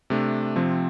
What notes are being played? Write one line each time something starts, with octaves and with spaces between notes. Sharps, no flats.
C3 A3 D4
C3 F3 C4